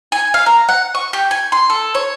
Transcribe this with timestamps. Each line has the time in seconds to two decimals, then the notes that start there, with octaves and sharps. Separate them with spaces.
0.12 G#5
0.34 F5
0.46 A#5
0.69 F#5
0.95 C#6
1.13 G4
1.31 G#5
1.52 C6
1.70 A4
1.95 C#5